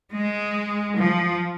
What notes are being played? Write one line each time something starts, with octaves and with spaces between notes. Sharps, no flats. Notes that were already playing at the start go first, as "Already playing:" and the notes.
G#3
F3